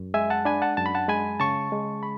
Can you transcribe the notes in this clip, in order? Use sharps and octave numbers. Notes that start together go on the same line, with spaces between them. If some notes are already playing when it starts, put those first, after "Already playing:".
Already playing: F#2
G#3 E5 G#5
F#5 A5
D4 G#5 B5
F#5 A5
F#2 A5
B5
F#5 A5
G#3 G#5 B5
C#3 A5 C#6
G#3
B5